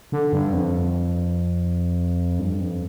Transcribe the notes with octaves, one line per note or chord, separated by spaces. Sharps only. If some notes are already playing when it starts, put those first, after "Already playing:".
D3
G2
F2
G2
F2